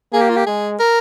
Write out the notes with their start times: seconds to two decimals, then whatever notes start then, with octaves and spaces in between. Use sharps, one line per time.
0.13 A#3 G#4
0.22 G4
0.29 F4
0.36 G4
0.47 G#3 G#4
0.79 A#4